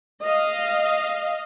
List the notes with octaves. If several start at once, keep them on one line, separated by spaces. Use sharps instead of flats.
D#5 F5